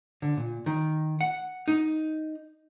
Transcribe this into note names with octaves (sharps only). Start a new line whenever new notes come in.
D3
A#2
D#3
F#5
D#4